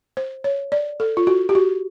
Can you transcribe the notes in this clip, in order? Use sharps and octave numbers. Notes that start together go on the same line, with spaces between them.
C5
C#5
D5
A4
F4
F#4
G4
F#4